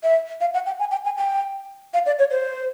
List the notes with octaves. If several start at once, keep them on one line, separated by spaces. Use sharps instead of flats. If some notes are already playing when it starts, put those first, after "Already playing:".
E5
F5
F#5
G5
G#5
G5
G#5
G5
F5
D5
C#5
C5